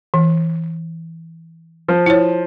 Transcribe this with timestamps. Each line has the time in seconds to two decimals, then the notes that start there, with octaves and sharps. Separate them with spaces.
0.14 E3
1.88 F3
2.06 E4 C#5